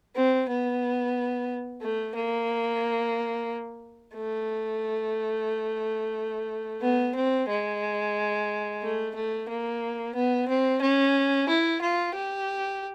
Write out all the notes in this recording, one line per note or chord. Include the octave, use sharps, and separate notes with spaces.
C4
B3
A3
A#3
A3
B3
C4
G#3
A3
A3
A#3
B3
C4
C#4
E4
F4
G4